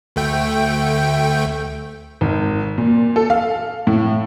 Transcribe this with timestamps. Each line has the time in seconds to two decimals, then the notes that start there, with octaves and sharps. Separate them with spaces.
0.16 D2 A3 G5
2.21 G#1
2.78 A#2
3.16 A4
3.30 F5
3.87 A2